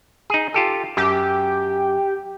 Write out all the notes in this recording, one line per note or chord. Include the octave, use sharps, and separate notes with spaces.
D#4 G#4
F4 G4 A4
F#2 G4